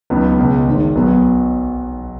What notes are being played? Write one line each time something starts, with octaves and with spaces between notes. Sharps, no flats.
C#2 C#3 F#3 B3 D#4
C#2 B2 G#3
G#1 G#2 D#3
B1 B2 F#3 B3